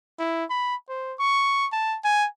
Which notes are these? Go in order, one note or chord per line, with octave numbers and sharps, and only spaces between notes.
E4
B5
C5
C#6
A5
G#5